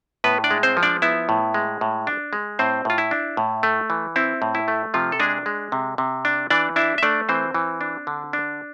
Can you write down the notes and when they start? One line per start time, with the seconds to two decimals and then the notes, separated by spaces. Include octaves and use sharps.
0.24 A2 B3 B4
0.44 D4 D5
0.51 G#3
0.63 C4 C5
0.77 F3
0.83 D4 D5
1.02 B3 E4 E5
1.29 A2
1.54 G#3
1.81 A2
2.07 D4
2.33 G#3
2.59 A2 C4 C5
2.85 A2 F4
2.98 E4
3.11 D4
3.37 A2
3.63 A3
3.90 E3
4.16 C4 E4
4.42 A2
4.55 E4
4.68 A3
4.94 C3 F3 F4
5.12 A4
5.20 G#3 D4 G#4
5.46 G#3
5.72 C3
5.98 C3
6.25 D4
6.50 E3 D4 D5
6.76 D4 E4 E5
6.98 E5
7.03 A3 D4 D5
7.29 E3 C4 C5
7.54 E3
7.81 D4
8.07 D3
8.33 D4